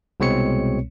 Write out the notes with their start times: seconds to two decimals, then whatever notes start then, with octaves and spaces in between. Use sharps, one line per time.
0.20 C2 B2 G#3 C4 C#5 C#7